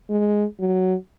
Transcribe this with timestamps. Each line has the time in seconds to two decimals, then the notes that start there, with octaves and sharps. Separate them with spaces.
0.10 G#3
0.60 F#3